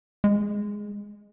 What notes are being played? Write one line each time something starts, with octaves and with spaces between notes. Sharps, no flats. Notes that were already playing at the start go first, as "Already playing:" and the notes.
G#3